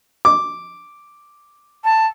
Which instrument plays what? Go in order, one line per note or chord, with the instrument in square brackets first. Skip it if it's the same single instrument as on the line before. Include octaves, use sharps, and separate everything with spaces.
[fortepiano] D6
[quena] A5